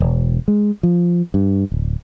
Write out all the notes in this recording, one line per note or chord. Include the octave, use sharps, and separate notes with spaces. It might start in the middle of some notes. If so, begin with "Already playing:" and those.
E1
G#3
F3
G2
D1